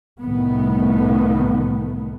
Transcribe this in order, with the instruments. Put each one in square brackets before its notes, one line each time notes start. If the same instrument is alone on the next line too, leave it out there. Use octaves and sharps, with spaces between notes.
[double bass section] C2 A2 D#3 A3 B3